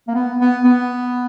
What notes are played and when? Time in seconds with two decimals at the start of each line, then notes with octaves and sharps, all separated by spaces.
0.08 A#3
0.15 B3
0.40 B3
0.64 B3